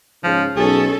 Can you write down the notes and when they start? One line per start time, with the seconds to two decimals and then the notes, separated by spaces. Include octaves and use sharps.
0.24 G#2 C#3 F3
0.57 B1 C#4 G#4 A4